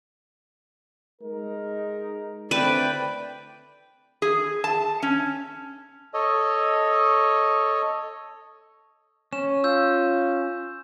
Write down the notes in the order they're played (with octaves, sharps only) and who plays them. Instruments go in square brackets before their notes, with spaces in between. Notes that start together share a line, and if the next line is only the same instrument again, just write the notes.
[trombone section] G#3 D#4 A#4
[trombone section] D3 A3 C4 [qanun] B4 [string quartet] D5 G5
[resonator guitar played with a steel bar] G#4
A5
C#4
[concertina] A4 C#5 D#5
[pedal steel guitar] C#4 [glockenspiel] E7
[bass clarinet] F4 [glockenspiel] E6 G6